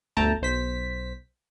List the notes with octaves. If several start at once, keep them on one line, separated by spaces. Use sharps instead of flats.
G1 D2 A3 G5 A5 A#5
B1 C5 B6